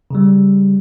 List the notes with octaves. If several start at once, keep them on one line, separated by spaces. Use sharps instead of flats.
C#3 G3